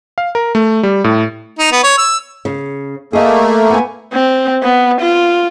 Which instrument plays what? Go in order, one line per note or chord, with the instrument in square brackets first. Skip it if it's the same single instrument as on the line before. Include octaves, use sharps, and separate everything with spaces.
[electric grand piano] F5
A#4
A3
G3
A2
[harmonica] D#4
B3
C#5
E6
[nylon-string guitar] C#3
[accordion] A3 A#3 [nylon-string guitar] G#4 D#5 E5
[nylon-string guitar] B3 G#5
[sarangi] C4
B3
F4